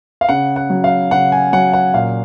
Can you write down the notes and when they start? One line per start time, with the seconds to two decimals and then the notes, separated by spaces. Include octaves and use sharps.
0.21 F5
0.29 C#3 F#5
0.56 F#5
0.70 F#3
0.84 F5
1.11 C#3 F#5
1.32 G#5
1.53 F#3 F#5
1.73 F#5
1.94 A#2 F5